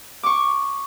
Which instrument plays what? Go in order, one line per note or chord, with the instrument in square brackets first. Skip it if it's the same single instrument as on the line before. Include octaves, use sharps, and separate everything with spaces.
[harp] C#6 D6